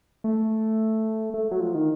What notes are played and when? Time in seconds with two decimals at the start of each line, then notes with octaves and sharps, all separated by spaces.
0.24 A3
1.34 A3
1.51 F#3
1.60 F3
1.75 D#3